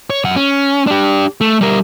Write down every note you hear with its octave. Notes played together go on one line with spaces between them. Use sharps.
C#5
F#2 F#5
C#4
D4 G4
A3
G3 A#4